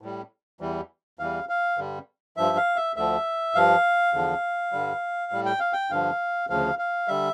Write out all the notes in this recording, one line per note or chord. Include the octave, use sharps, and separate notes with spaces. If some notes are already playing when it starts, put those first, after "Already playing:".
A2 G3
E2 E3 G3
E2 E3 G3 F5
F5
G2 D3 G3
G2 F3 E5
F5
E5
D2 D3 F3 E5
G2 F3 F5
E2 D3 F3
G2 D3 G3
A2 G3
G5
F5
G5
G2 D3 F3 F5
D2 C#3 F3 F5
F5
D3 G3 E5